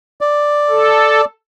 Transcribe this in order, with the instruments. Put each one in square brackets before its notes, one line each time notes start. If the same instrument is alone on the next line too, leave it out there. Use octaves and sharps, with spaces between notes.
[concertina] D5
[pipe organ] A4